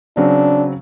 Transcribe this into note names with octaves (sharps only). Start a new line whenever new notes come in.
C#3 F#3 C4 D4